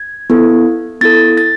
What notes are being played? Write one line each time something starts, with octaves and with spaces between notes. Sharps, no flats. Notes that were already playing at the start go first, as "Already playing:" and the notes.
Already playing: G#6
B3 E4 A4
B3 E4 A4 A6
A6